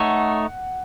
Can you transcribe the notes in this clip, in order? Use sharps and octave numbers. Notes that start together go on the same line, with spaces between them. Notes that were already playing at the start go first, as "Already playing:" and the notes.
Already playing: A3 D#4 A4 C#5 F#5